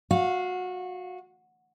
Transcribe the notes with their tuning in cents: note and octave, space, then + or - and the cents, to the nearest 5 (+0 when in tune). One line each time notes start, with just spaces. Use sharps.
F#4 -20 F5 +0